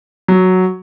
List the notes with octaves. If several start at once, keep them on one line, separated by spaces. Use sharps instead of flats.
F#3